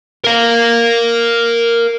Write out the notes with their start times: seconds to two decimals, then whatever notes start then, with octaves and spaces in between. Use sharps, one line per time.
0.24 A#4 F5